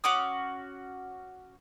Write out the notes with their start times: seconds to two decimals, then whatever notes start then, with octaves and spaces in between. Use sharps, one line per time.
0.04 C#4 F#4 D6 D#6